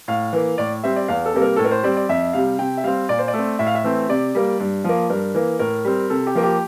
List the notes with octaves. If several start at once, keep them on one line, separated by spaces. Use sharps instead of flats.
A2 F5
E3 A#3
A2 D5
G3 C4 E5
D5
E2 F5
A4
C3 G3 A#3
A#4
A2 A4
A#4
C5
G3 C4 D5
D5
F2 E5
C3 G3 F5
C3 G5
E5
G3 C4 F5
A#2 D5
C5
D5
A3 C4
A2 E5
F5
E5
E3 A3 C4
C3 D5
G3 A#3
G2
F3 A#3
G2 A#4
E3 A#3
A2 A#4
G3 C4
C3 A4
G4
F3 A#3
G4